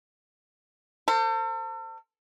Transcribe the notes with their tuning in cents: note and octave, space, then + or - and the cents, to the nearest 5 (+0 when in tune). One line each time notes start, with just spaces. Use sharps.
A4 +40 C5 +0